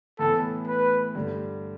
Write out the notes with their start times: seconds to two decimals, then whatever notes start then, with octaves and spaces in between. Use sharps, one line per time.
0.19 A2 E3 B3 A4
0.68 B4
1.15 G2 D3 G3